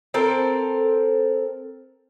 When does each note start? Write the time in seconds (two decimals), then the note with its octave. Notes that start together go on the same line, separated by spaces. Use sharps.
0.14 C4 A4 A#4 C5